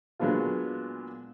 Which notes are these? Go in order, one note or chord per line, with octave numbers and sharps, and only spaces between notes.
A#2 F#3 G#3 B3 D4 F4